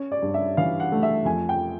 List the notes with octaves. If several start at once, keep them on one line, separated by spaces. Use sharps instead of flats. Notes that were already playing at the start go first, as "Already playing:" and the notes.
Already playing: C#4 C#5
D5
G2
E5
E3 F5
F#5
A3
E5
F2 G#5
G5